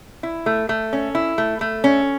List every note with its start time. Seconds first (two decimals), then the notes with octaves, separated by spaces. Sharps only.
0.23 E4
0.46 A3
0.69 A3
0.93 C#4
1.15 E4
1.38 A3
1.61 A3
1.84 C#4